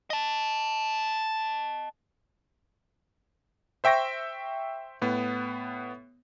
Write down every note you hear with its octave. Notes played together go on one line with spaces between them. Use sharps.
D#5 A5
C5 E5 G5 C#6 A#6
A2 B3